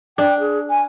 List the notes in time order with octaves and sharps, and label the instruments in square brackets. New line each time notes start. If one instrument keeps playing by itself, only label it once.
[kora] D4 [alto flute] G5
[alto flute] G#4
G#5